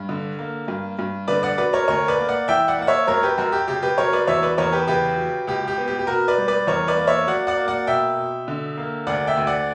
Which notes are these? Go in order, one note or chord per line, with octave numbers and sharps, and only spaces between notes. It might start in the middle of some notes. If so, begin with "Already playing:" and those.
Already playing: G2
D3
A#3
G2
G2
D3 B4 D5
D5 F#5
F#3 B4 D5
A#4 C#5
D2 A#4 C#5
B4 D5
A#3
D5 F#5
E3 E5 G5
D5 F#5
A#3 F#5
C#5 E5
F#2 A#4 C#5
G4 B4
F#2 F#4 A#4
G4
C#3 G4
G4 B4
F#3 A#4 C#5
B4 D5
E2 C#5 E5
B4 D5
E2 A#4 C#5
G4 B4
C#3 G4 B4
F#3
C#2 G4
G4
B3
G4
G4
B2 F#4 A#4
B4 D5
G3
B4 D5
E2 A#4 C#5
B4 D5
A#3
C#5 E5
F#3 D5 F#5
D5 F#5
A#3
D5 F#5
B2 E5 G5
B2
D3
A#3
D2 D5 F#5
E5 G5
D2
D5 F#5